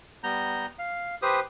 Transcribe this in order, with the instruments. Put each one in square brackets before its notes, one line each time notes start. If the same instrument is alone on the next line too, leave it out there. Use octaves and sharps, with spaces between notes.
[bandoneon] G3 B3 A#5 G6
F5
G4 B4 C5 D#6